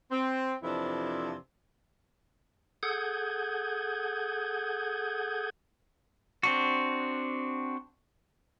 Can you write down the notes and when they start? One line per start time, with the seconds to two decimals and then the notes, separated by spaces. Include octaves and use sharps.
0.11 C4
0.63 F2 C3 E3 F3 D4 E4
2.83 G#4 A4 F#5 D#6 G6 G#6
6.43 C4 D4 F#4